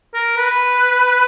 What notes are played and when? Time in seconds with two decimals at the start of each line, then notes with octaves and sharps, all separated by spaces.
0.14 A#4
0.37 B4